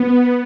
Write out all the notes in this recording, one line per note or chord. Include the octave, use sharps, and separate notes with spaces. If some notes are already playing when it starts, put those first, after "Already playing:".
Already playing: B3